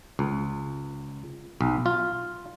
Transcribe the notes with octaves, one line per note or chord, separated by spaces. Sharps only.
C#2
B1
F4